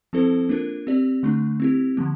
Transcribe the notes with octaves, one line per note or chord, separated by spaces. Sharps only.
F3 C4 E4 A4 C5
A#3 D4 F4 A#4
C4 G4 D5
D3 A3 D4
C4 E4 G4
D3 F3 A#3